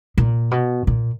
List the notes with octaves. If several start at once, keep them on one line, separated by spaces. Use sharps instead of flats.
A#2
B2
A#2